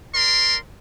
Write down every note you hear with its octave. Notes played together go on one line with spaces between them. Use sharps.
A#4 D5 C6